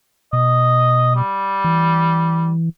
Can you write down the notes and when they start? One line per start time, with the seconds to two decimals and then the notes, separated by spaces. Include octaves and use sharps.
0.33 B2 D#5
1.16 G3
1.64 E3